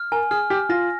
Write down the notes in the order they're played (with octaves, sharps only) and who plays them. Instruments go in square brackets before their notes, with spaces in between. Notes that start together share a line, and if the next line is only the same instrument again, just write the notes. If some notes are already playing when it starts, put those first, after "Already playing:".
Already playing: [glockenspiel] F6
[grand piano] A#4 [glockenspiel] G#5
[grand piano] G#4 [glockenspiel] F6
[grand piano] G4 [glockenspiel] F6
[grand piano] F4 [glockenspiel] A#6